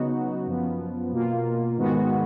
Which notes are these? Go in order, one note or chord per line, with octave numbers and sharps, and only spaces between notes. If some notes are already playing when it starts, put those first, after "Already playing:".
Already playing: C#3 F#3 B3 D#4 F#4
F#2 F3 B3
B2 A#3 F4
G#2 D#3 G#3 B3 F#4